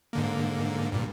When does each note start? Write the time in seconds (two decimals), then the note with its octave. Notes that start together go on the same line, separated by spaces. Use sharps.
0.13 G#2 D3 A#3
0.92 G2 A#2